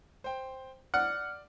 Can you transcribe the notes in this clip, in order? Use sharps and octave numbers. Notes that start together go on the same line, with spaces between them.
C5 G5
D5 F#5 F6